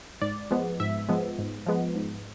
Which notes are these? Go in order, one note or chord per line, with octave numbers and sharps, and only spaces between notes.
G#2 D5
F3 G#3 B3
G#2 E5
F3 G#3 B3
G#2
F3 G#3 B3
G#2